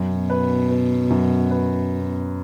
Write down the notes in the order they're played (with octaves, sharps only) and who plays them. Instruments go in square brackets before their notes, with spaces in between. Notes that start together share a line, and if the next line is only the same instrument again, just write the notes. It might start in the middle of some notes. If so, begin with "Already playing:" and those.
Already playing: [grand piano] F#2 [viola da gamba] B2
[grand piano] B4
B4
F#2
B4